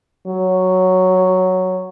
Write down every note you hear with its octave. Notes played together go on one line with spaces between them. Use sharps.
F#3